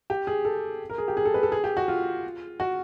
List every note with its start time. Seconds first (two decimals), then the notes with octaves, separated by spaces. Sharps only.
0.10 G4
0.27 G#4
0.45 A4
0.90 A#4
0.98 G#4
1.08 G4
1.17 G#4
1.25 A4
1.34 B4
1.43 A4
1.52 G#4
1.64 G4
1.77 F#4
1.88 F4
2.60 F#4